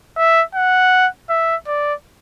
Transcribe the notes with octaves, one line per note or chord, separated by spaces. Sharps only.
E5
F#5
E5
D5